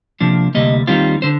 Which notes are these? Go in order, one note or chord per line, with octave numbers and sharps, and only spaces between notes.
C3 F3 A#3 D4
D2 C3 G3 A#3 D#5
D#2 D#3 G3 C4 F4
D3 C5